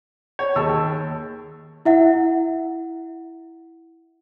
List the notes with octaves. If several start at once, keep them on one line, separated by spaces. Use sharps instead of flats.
C#5
D#2 G#4 A5 E6
E4 E5 F#5